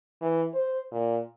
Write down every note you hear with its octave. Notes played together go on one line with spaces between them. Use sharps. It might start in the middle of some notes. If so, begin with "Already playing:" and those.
E3
C5
A#2